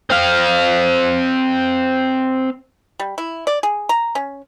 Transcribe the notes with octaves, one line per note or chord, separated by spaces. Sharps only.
C4 F5
G3
E4
D5
G#4
A#5
C#4